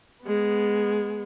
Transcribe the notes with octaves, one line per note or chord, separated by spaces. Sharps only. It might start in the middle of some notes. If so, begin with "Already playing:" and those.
G#3 B3